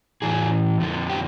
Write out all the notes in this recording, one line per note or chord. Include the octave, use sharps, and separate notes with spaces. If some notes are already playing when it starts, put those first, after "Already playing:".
A2 E3 G#4
F2 D3 F3
G4